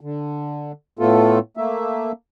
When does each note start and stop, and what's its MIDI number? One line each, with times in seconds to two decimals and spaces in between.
0.01 0.72 50
0.99 1.39 45
0.99 1.39 57
0.99 1.39 59
0.99 1.39 65
0.99 1.39 69
1.57 2.12 57
1.57 2.12 58
1.57 2.12 76